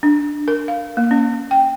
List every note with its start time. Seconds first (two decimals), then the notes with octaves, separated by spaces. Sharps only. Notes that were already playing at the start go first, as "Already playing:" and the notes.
0.03 D4
0.48 A#4
0.68 F5
0.97 A#3
1.11 C#4
1.51 G5